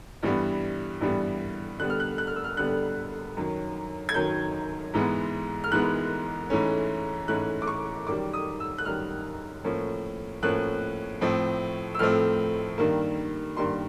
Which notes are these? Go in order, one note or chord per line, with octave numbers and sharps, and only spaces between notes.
G2 E3 G3 B3
G2 E3 G3 B3
D3 G3 B3 F#6
F6
F#6
F#6
F6
E6
F6
D3 G3 B3 F#6
F#2 D#3 F#3
G#6
F#2 D#3 F#3 G6
G#2 E3 G#3 B3
F6
G#2 E3 G#3 B3 F#6
G#2 E3 A3 C#4
G#2 E3 A3 C#4 F#6
D6
C#6
F#2 D#3 G3 D6
D#6
E6
F#6
F#2 D#3 G3 F6
A2 F3 A#3 C#4
A2 F3 A#3 C#4 F#6
A2 F3 A3 C4
E6
A2 F3 A3 C4 F6
G2 D#3 G3 A#3
G2 D#3 G3 A#3 C6